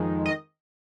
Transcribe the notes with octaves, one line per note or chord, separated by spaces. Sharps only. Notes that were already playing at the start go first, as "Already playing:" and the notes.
Already playing: F2 D#3 G#3
D#5